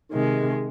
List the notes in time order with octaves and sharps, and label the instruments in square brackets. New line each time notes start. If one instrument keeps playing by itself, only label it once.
[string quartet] C3 D#3 G#3